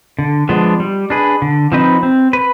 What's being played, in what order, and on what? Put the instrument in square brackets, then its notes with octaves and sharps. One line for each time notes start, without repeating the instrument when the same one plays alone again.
[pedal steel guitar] D3
F3 G#3 B3 D4
G3
D4 G#4 B4
D3
F3 C4 D#4 B4
C4
B4